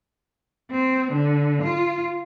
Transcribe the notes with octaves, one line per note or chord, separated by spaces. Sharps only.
C4
D3
F4